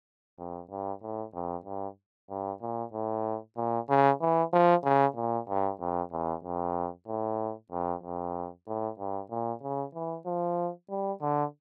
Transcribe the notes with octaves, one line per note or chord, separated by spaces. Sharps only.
F2
G2
A2
F2
G2
G2
A#2
A2
A#2
C#3
E3
F3
C#3
A#2
G2
F2
E2
F2
A2
F2
F2
A2
G2
A#2
C#3
E3
F3
G3
D3